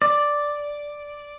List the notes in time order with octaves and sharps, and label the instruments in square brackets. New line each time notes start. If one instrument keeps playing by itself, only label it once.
[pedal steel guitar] D5